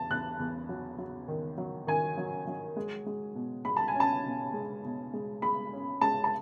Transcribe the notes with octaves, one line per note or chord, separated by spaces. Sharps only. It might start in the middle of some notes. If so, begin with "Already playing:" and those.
Already playing: E2 A5
E2 F#6
E2
F#3
F#3
D#3
F#3
D#3 G#5
F#3
F#3
G#3
G#3
B2
G#3 B5
A5
G#5
C#4 A5
B2
G#3
B2
G#3
G#3 B5
C#4
G#3 A5
A5